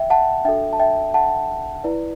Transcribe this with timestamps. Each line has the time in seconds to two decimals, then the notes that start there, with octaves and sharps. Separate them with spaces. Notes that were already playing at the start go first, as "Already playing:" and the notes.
Already playing: E5 G5
0.10 F#5 A5
0.45 D4 F#4 A4 E5 G5
0.73 A5
0.80 E5 G5
1.14 F#5 A5
1.84 E4 B4 D5